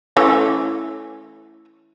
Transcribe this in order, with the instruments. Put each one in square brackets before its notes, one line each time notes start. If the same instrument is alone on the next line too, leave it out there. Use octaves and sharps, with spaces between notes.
[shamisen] E3 A3 C#4